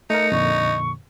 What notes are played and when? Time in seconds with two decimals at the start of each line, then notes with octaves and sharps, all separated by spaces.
0.10 A3 D#4 A#4 C#7
0.32 F2 A#2 D3 C#6